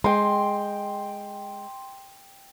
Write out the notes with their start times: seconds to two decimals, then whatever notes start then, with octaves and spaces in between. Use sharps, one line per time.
0.04 G#3 G5 C6